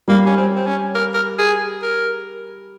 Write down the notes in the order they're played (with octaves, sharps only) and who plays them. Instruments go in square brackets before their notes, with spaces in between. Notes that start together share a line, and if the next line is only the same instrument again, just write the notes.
[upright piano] G3 [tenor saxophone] A#3
[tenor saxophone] C#4
C4
C4
C#4
A#4
A#4
G#4
A#4